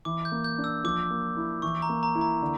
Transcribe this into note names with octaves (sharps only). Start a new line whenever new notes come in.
E3 D6
G6
A#3
G6
D4
E6
F3 D6
A#3
E4
E3 C#6
A#5
A#3
A#5
E4
A#5
D3